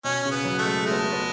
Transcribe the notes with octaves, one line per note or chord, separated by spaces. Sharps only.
B2 C#4
C#3
B3
F#3
A3
G#3
G#3 A3
B3
A3
B3